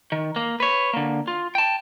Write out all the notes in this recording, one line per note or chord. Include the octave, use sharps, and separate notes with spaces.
D#3
A#3
B4 C#5
D3 A#3
F4
G5 A5